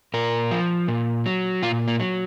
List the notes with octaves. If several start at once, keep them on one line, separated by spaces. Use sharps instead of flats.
A#2 A#4
F3
A#2
F#3
A#2 F4
A#3
F#3